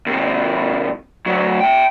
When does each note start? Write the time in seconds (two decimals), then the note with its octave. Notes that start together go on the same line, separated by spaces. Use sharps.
0.06 D#2 C3
1.26 D2 F#3
1.61 E5 G5